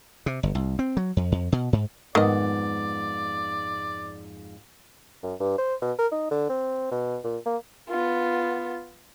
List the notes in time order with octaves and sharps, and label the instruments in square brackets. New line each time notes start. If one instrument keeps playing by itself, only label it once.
[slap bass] C3
G1
C2
C4
F#3
F2
F2
B2
G#2
[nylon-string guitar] F2 G#2 B3 [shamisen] D#3 D#5 [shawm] D5
[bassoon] F#2
G2
C5
B2
A#4
D#4
D3
C4
B2
A#2
A#3
[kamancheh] B3 F4